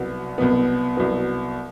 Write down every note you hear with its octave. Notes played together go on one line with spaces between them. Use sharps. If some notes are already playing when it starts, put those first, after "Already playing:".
Already playing: C2 B2 F#3 B3
C2 B2 F#3 B3
C2 B2 F#3 B3